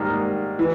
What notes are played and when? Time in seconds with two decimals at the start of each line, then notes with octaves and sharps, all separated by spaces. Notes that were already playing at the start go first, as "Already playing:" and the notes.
Already playing: G#2 D#3 G3 A#3
0.59 E3